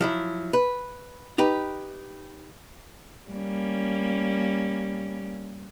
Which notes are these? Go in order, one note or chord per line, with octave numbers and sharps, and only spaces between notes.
F3 F#3 E4
B4
D#4 G4 B4
G3 A#3 C#4